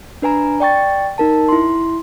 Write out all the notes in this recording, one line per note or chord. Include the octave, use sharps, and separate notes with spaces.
D4 B4 G#5 A#5
D5 G5 C#6 A6
D#4 A#4 A5
E4 C6